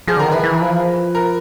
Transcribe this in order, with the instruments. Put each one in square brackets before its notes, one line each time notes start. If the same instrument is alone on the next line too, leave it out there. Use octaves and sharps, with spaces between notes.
[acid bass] F3 [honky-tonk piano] G#4
[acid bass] D3 [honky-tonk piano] A#4
[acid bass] D#3
[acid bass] E3 [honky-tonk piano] B4
[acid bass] E3
F3
[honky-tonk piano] A#4